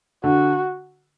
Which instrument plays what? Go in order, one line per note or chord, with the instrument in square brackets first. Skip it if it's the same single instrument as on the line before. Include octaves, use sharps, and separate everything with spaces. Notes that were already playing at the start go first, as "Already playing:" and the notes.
[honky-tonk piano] D3 [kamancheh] F#4